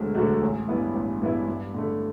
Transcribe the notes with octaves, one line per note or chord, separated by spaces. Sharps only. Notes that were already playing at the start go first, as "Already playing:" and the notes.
Already playing: E1 D2 D3 F#3 A3
D2 D3 F#3 A3
A1
G2 E3 B3 E4
A1
G2 E3 B3 E4
G2
D3 A3